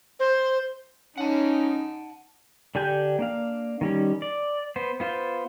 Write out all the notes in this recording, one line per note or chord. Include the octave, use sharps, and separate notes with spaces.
C5
C#4 D#4 F#5 A5
D3 D4 G4 G#5 G6
A#3 D4 F5
D#3 G3 C#4
D5
B3 C5
B3 F4 C5